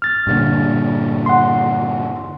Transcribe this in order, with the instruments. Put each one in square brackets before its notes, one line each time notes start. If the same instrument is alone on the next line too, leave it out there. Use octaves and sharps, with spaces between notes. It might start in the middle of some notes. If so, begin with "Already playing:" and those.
[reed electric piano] F6 A6
[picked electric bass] G2 A#2 D3
[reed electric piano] F#5 C6